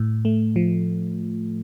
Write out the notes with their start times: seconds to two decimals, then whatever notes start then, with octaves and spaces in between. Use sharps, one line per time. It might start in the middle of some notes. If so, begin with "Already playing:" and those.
Already playing: A2
0.25 A3
0.56 F3